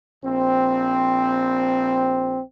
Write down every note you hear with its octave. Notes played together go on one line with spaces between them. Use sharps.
A#1 C4